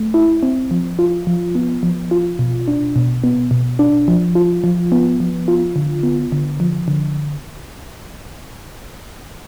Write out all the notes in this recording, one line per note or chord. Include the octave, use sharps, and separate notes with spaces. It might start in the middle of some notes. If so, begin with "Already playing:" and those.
Already playing: A3
E4
C4
F3
F4
F3
B3
F3
F4
B2
D4
B2
B3
B2
D4
F3
F4
F3
B3
F3
F4
D3
B3
D3
F3
D3